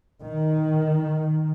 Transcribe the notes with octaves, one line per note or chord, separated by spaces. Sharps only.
D#3